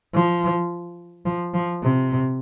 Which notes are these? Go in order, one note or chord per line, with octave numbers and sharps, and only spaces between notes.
F3
F3
F3
C3